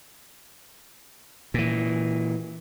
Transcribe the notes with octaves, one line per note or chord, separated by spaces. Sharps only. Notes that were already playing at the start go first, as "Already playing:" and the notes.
A#2 E3